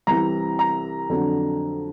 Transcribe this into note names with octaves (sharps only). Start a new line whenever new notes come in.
C2 C3 E3 A#5
A#5
F2 D3 F#3